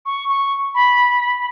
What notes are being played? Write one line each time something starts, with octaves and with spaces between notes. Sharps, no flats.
C#6
C#6
B5